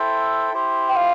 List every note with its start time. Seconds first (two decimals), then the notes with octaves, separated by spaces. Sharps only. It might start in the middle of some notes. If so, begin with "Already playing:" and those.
Already playing: E4 A4 C5 E5 G5
0.52 E4 G4 C5
0.89 G5
0.96 F5